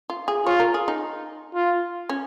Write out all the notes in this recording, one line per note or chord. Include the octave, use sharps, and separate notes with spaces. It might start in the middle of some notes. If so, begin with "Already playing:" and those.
F4
G#4
F4 C#5
A#4
G#4
D#4
F4
C#4